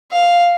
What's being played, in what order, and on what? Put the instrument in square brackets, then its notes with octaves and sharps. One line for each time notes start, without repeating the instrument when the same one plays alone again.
[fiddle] F5